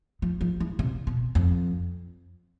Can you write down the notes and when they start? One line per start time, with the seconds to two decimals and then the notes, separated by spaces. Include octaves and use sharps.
0.22 F3
0.41 F3
0.60 E3
0.79 C3
1.07 B2
1.35 F2